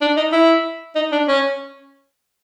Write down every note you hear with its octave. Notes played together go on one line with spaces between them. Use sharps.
D4
D#4
E4
D#4
D4
C#4